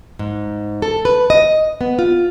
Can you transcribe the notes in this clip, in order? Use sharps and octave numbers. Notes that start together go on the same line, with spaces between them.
G#2
A4
B4
D#5
B3
F4